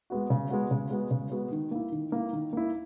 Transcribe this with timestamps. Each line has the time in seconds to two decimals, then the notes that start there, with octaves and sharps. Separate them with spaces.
0.10 G#3 B3 F#4
0.30 C#3
0.50 G#3 B3 F#4
0.71 C#3
0.91 G#3 B3 F#4
1.11 C#3
1.31 G#3 B3 F#4
1.52 D#3
1.71 A#3 E4
1.92 D#3
2.12 A#3 E4
2.33 D#3
2.53 A#3 E4